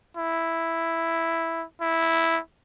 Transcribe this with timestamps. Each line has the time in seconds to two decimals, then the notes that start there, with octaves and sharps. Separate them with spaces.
0.17 E4
1.81 E4